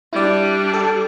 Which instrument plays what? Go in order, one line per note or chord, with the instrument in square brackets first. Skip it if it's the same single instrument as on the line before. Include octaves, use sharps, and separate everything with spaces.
[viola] G3 D4 [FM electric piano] E4 D5
[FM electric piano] A4